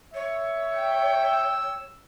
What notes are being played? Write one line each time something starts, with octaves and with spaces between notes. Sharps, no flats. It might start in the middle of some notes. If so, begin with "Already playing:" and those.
C#5 E5
G5
E6